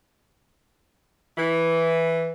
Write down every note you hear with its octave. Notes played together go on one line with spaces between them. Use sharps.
E3